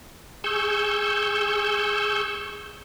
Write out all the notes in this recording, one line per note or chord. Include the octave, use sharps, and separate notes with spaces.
G#4 C#6 E6 G6